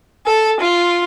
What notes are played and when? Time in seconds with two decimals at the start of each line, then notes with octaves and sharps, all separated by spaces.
0.26 A4
0.60 F4